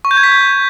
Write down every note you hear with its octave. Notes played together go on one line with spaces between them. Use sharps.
C#6
G6
G#6
B6